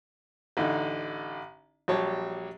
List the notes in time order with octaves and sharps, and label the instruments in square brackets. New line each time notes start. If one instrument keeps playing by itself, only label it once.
[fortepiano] A1 D3 D#4
A#1 F#3 G3 G4 C#5 A5